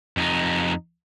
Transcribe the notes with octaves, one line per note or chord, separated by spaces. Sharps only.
F2 D#4